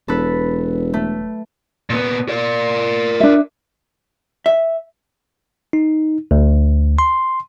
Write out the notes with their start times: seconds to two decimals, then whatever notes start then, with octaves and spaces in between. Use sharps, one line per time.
0.08 E1 A4 B4
0.94 A3
1.90 A#2 B3
2.29 A#4 D5
3.20 D4 E5
4.46 E5
5.73 D#4
6.31 D2
6.99 C6